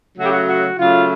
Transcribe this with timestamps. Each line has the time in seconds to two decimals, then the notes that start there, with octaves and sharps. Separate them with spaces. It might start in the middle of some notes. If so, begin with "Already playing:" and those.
0.16 C#3 F#3 A3 F#4
0.26 G4
0.32 F#4
0.48 F#4
0.79 C#3 F#3 A3 F4